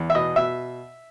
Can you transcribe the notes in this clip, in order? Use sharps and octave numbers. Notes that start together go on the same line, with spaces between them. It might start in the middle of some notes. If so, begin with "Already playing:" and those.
Already playing: E2
E5
B2 D#5
B2 E5